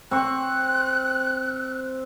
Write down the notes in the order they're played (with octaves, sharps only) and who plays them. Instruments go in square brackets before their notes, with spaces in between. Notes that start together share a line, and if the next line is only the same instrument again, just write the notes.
[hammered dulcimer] C4 C#6 [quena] F#6